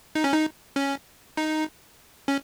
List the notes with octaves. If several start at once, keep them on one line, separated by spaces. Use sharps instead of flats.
D#4
C#4
D#4
C#4
D#4
C#4